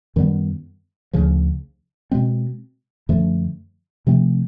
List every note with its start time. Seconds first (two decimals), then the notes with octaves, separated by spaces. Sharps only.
0.16 F#2 D#3 G3 B3
1.13 D2 C#3 F3
2.11 B2 G#3 C4
3.09 F#2 D3 F3 A3
4.07 C3 F3 A3 C4